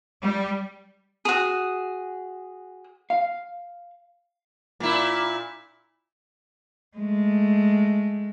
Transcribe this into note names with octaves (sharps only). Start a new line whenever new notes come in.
G3
F#4 G#4
F5
A#2 E4
G#3 A3